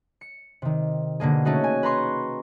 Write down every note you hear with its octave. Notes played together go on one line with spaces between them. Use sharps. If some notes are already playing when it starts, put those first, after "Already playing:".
C#7
C3 D#3
B2 D3 A#3 G#4
A3 C#4 D#4 F#4 G#4
G#5
B4 A#5 C6 C#6